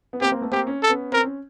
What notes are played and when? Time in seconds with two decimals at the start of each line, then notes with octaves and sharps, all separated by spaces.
0.13 B3
0.21 A#3 C4 G4
0.32 A#3 C4
0.41 A3 B3
0.52 A#3 C4 G4
0.67 C#4
0.82 A4
0.89 B3 C#4
1.12 C4 A#4
1.24 C#4